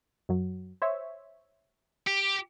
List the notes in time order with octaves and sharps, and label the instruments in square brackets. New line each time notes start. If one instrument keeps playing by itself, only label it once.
[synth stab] F#2 F#3
C5 C#5 E5
[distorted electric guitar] G4